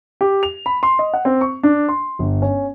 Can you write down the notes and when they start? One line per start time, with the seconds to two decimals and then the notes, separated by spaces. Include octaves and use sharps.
0.21 G4
0.43 F7
0.66 B5
0.83 C6
0.99 D#5
1.14 F#5
1.25 C4
1.41 C#6
1.63 D4
1.89 C6
2.19 G1
2.42 C#4